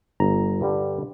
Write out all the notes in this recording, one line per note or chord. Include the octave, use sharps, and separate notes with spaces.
G1 A#5
G2 D3 G3